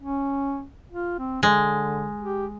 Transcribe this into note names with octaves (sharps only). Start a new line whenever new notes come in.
C#4
F4
C4
D3 G#3
G4